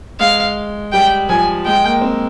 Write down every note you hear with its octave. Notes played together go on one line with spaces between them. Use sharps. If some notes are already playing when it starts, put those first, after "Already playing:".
G#3 F5
G3 G5
F3 G#5
G#3 G5
A#3
C4